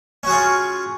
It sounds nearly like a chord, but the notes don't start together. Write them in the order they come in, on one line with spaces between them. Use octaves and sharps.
C#4 F#4 G#4 F4